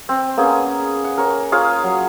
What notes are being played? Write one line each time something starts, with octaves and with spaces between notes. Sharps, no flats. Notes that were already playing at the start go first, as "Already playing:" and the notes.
C4
A#3 B3 C#4 G#4
F#5
A#4 C#5
F4 G#4 C#5 F5
F#3